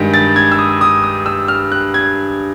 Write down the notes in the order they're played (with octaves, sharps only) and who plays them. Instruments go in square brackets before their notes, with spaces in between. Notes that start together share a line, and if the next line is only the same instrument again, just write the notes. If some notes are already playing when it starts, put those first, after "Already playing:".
Already playing: [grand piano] G2 D#3 G#3
A6
G#6
E6
D#6
D#6
D#6
E6
F6
F#6
G#6